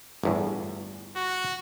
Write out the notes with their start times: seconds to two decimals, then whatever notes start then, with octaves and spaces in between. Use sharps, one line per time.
0.24 G1 E2 A2
1.16 F#4